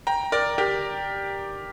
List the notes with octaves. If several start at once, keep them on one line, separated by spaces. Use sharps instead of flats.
G5 A#5
A#4 D5
G4 A#4